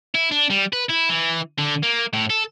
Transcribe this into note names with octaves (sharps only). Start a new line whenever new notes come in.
E4
D4
G3
B4
E4
E3
D3
A#3
A2
A4